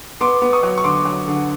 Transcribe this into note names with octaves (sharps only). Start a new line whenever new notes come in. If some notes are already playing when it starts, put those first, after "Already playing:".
B3 C6 D6
B3
C#6 D#6
F#3
C#6
D3 C6 D6
F#3
D3